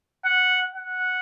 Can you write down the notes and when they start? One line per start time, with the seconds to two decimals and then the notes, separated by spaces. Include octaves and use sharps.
0.25 F#5
0.74 F#5